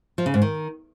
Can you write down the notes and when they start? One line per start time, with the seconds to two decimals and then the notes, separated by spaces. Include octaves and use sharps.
0.18 F3
0.26 C#3
0.34 G#2
0.42 D#3